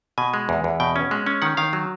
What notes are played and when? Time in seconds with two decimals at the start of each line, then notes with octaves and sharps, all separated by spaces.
0.18 B2 G#5
0.34 G#3
0.49 E2
0.64 E2
0.80 B2 G5
0.96 C#4
1.11 G#3
1.26 C#4
1.42 D#3 F#5
1.57 D#3 F5
1.73 F#3